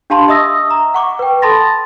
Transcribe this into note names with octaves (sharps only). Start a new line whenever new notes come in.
D4 G4 F5 A5 B5 C6
D#5 E5 C#6 D#6 E6 A#6
A#5
F#5 C#6 D6
B4 G5
A4 A5 B5 C6 A6 A#6